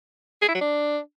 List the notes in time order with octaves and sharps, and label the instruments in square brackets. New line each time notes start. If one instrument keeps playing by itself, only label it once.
[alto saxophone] G#4
E4
F#3
D4